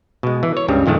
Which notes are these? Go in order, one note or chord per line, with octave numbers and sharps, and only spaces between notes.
B2 G#3
E3
C#5
C#2 G2 C#3 G3
F2 A#2 D#3 G#3 A3